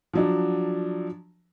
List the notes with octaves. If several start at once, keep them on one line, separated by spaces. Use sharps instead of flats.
F3 F#3 D4